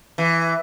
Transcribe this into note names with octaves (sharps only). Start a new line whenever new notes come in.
E3